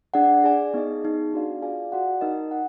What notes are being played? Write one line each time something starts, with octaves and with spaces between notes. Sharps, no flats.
D4 G#4 D5 F#5
G#4 D5 G#5
B3 D#4 G#4 D#5
B3 D#4 G#4
D4 F#4 D5 F5
F4 G#4 D5 F5 G#5
F#4 D5 F#5
D#4 A#4 D#5
F#5